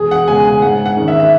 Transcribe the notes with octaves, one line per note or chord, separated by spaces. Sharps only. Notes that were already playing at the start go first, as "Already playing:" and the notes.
Already playing: E1 G#4
F#5
E2 C#3 G#3 G#5
G#5
G#2 F#5
F#5
D#3 G#3 C#4
E5
E5